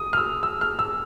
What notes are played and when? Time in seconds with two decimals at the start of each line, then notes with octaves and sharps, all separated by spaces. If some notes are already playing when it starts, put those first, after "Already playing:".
Already playing: D#6
0.13 F6
0.17 E6
0.43 E6
0.61 F6
0.79 E6